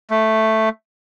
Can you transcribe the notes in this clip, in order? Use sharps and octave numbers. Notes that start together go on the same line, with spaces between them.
A3